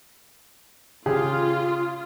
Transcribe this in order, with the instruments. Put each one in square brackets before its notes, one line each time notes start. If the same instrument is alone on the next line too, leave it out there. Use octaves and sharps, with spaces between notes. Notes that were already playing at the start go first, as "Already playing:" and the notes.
[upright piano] C#3 G4 G#4 [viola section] F4